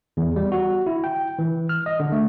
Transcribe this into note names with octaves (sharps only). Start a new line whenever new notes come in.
E2
G3
F#4
E4
G5
E3
F6
D#5
D3
A3